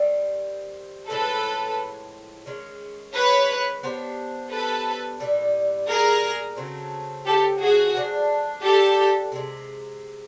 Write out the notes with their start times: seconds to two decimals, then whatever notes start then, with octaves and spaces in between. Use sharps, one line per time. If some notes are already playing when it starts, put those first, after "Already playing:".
Already playing: D#3 G3 C4
1.09 A2 F3 G#3 A4 B4
2.46 D#3 G#3 C#4
3.15 B4 C#5
3.83 B3 D4 G4 C5
4.52 A4 B4
5.20 A#2 G3 B3 E4
5.88 G#4 A#4
6.57 C#3 F#3 A3 C4
7.26 G4 A4
7.60 F#4 G#4
7.95 F3 A3 D4
8.63 G4 A4
9.32 C3 D#3 G#3